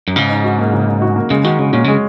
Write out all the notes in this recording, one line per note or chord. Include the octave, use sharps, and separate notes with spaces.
F#2
G#2 C#3
D#4
F#4
A#3
C#3
D#4
F#4
A#3
C#3 G#3
D#3 F#4
C#3 G#3
A#2 C#4
C#3 G#3